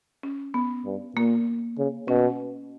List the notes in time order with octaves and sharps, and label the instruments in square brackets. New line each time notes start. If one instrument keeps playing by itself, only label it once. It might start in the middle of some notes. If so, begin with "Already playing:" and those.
[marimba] C#4
B3
[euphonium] G2
[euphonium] A#2 [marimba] A#3
[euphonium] C#3
[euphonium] B2 [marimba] C#4